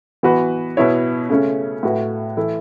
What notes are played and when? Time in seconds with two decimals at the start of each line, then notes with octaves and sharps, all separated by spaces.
0.23 E3 B3 F#4 B4
0.77 B2 B3 E4 C#5
1.29 C#3 A3 C#4
1.83 A2 A3 F#4 B4
2.37 E3 A3 E4 A4